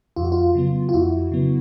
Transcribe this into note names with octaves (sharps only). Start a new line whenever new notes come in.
F2 F4
F#4
F4
C#3 F#3 B3
F4
F2 E4 F#4
C#3 F#3 B3